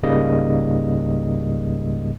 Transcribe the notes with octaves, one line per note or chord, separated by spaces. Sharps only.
C#2 G#2 C#3 G3 A#3 D#5